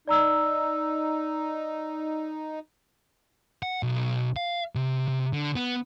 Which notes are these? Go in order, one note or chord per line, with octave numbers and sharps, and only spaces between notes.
D#4 D5 A#5 E6
F#5
B1
F5
C3
C3
D3
B3